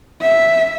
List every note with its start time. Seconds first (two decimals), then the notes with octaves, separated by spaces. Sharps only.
0.21 E5